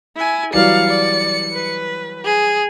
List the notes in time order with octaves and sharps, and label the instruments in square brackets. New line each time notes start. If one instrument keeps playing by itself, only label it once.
[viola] E4 G#5
[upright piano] E3 F#3 G3 [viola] D5 F5 [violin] C#7
[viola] D5
B4
[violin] G#4